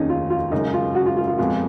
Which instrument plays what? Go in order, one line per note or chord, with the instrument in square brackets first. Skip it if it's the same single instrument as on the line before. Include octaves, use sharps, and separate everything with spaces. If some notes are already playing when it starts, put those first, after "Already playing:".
Already playing: [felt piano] F1 D#2 D#3 [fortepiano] C#4 D#4
[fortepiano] F4
F4
[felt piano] F#2 C#3 G#3 [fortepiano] D#4
[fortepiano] F4
F#4
F4
F4
F4
[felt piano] F1 F2 F3 G#3 B3 [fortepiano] F4